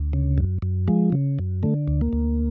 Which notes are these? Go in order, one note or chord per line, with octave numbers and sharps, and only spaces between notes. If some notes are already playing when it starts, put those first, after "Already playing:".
Already playing: D2
C#3
F#2
F#2
F3 G#3
C#3
F#2
D3 A3
D2
A#3
D2